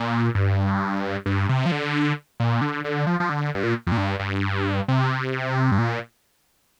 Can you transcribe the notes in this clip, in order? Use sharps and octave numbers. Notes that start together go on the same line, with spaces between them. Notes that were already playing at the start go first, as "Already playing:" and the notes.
Already playing: A#2
G2
G2
C3
F3
D3
A#2
D3
D3
F3
F3
D3
G2
A#2
F2
A#2
G2
G2
C3
G2
A#2